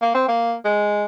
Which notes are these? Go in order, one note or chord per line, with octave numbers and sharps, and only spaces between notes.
A#3
C4
A#3
G#3